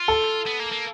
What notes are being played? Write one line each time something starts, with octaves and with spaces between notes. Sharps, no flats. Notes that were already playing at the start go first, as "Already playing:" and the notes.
Already playing: F4
A4
B3
A#3
A#3